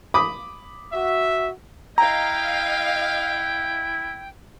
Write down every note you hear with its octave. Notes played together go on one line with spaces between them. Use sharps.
B5 D6 D#6
F#4 E5
E4 D#5 F5 G5 A#5